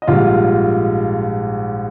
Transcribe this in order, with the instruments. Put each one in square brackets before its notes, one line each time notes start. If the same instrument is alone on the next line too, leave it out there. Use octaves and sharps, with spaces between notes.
[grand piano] D#5
A#1 G#2 G3 F4 F5